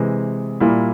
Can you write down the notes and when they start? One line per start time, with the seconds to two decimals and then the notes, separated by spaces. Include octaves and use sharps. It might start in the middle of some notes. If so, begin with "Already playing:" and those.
Already playing: C3 E3 G#3
0.60 A#2 G3 A#3 E4